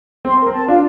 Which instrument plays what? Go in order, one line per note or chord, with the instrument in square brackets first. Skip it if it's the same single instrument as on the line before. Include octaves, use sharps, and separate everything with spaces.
[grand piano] C4 [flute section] C6
[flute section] A#4
[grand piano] C4
[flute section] A5
[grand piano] D4 [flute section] F4